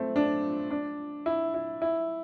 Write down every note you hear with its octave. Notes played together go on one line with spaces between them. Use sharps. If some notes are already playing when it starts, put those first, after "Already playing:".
Already playing: A3 C4
D4
D4
E4
E4
E4